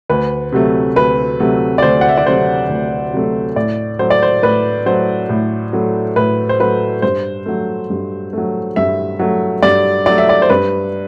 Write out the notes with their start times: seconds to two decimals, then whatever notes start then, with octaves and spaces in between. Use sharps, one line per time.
0.09 D2 B4
0.52 C3 F#3 A3
0.96 D2 B4
1.40 C3 F#3 A3
1.78 D5
1.82 D2 C5
2.01 F#5
2.09 E5
2.18 D5
2.26 C3 F#3 A3 C5
2.69 D2
3.13 C3 F#3 A3
3.56 A2 D5
3.99 F#3 A3 C5
4.10 D5
4.23 C5
4.43 A2 B4
4.86 F#3 A3 C5
5.29 A2
5.73 F#3 A3
6.16 A2 B4
6.49 C5
6.60 F#3 A3 B4
7.02 G2 C5
7.46 F#3 A3
7.90 G2
8.33 F#3 A3
8.76 G2 E5
9.19 F#3 A3
9.62 G2 D5
10.06 F#3 A3 D5
10.18 E5
10.29 D5
10.42 C5
10.50 G2 B4